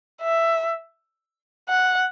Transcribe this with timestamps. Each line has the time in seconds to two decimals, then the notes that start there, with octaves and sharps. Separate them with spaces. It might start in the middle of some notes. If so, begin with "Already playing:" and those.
0.22 E5
1.69 F#5